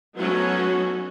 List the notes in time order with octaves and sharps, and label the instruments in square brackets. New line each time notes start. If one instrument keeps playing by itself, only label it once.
[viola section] F#3 A3 B3 C#4 D#4 F#4